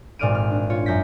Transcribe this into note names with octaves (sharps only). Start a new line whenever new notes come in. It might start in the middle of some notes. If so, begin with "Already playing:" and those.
G#1 A#2 D5 F6 D7 D#7
F6
D4
F4 C#5
F#2 G6 A#6 B6